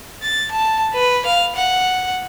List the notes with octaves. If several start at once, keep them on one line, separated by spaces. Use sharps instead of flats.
A6
A5
B4
F5
F#5